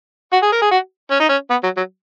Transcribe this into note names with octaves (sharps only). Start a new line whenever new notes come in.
F#4
G#4
A#4
G#4
F#4
C#4
D#4
C#4
B3
F#3
F#3